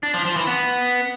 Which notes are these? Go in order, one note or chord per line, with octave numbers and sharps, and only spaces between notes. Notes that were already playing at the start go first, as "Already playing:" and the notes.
D4
F3
F3
E3
B3